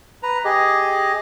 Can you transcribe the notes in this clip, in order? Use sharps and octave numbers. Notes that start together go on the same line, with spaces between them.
B4 A#5
G4 G#4 D#5